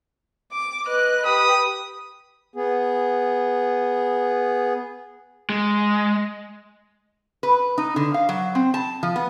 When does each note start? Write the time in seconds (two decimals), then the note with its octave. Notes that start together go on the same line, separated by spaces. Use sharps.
0.52 D6
0.85 B4 D#5 F#6
1.25 G4 B4 B5 D#6
2.56 B3 G#4
5.50 G#3
7.43 B4
7.78 D#4
7.96 D3
8.14 F5
8.29 F#3
8.55 C4
8.74 A5
9.03 F3
9.16 B3